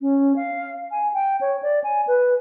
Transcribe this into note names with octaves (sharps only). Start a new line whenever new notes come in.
C#4
F5
G#5
G5
C#5
D5
G#5
B4